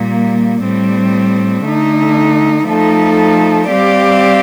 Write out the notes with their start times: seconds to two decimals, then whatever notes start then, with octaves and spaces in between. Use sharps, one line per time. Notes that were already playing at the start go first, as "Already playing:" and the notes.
Already playing: A#2 G3 A#3
0.63 A2 G3 C4
1.65 D3 A3 D#4
2.66 F3 A3 D#4 A4
3.68 G3 C4 G4 D5 F5